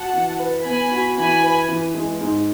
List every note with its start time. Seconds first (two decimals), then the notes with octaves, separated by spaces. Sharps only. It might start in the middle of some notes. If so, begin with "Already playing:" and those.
Already playing: F#4 F#5 A5
0.13 E3
0.39 B4
0.65 B3 G#5 B5
0.91 F#4
1.16 E3 G#5 B5
1.43 B4
1.68 E3
1.94 G#3
2.21 G#2